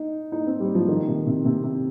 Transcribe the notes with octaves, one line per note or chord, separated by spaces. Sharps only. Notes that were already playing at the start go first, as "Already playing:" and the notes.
Already playing: D#4
D#4
C4
G3
F3
D#3
C3
C3
C3
C3